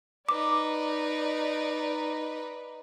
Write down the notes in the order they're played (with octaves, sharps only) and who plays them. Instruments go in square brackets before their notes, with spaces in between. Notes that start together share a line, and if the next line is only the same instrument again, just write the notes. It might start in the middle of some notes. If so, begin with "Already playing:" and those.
[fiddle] D#4 B4 [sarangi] D5 [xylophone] D6